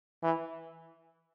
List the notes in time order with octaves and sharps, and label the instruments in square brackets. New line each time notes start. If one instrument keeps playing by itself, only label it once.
[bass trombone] E3